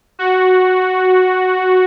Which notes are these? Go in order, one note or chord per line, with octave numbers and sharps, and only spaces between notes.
F#4